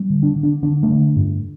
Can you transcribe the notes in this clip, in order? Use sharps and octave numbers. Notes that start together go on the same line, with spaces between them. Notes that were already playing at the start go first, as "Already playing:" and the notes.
Already playing: G3
D3
D4
D3
D4
D3 D4
A3 D4
D3
G2